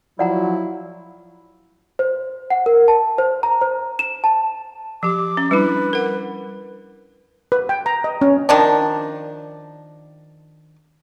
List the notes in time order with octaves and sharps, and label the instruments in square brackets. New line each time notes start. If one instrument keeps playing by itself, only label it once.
[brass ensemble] F3 F#3 [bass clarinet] E4 [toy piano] D5 F#5 A#5
[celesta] C5
F#5
A#4
A5
C5
A#5
C5
E7
A5
[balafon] F3 G4 [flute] D6
[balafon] C#4
[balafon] G3 D4 E4 [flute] B4
[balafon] A#4 F#5
[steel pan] B4
G5
A#5
D#5
C#4
[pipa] D#3 F3 D4